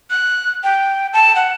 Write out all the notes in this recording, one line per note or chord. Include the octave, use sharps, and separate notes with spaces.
F#6
G5
A5
F#5